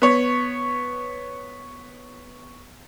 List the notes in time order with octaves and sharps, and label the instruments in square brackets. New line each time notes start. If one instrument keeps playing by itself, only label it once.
[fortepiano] B3 C#5